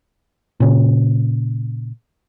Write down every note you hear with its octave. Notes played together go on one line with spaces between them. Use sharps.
A#2 C#3